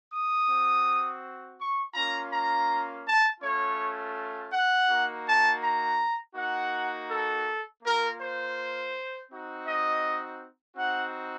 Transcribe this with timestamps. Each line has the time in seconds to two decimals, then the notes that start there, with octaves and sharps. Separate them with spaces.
0.10 D#6
0.47 C4 F#4
1.57 C#6
1.94 A#3 C#4 F4 A#5
2.30 A#5
3.04 A5
3.41 A3 C#4 F4 C#5
4.51 F#5
4.88 A#3 D#4 F#4
5.25 A5
5.61 A#5
6.34 A#3 D#4 F#4 F#5
7.09 A4
7.82 A#3 F4 A#4
8.19 C5
9.29 C4 D#4 F#4
9.65 D#5
10.76 C4 D#4 F#4 F#5